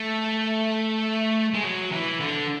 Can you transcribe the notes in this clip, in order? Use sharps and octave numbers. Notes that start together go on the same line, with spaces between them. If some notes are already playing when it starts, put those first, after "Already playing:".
Already playing: A3
G#3
F#3
E3
D3